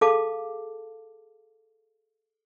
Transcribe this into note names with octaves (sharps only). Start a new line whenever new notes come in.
G#4 A4 F5 A5 D6